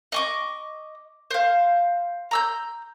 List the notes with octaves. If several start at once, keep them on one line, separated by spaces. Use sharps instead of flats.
D#5 C#6 D6
C5 F5
A#5 E6 G6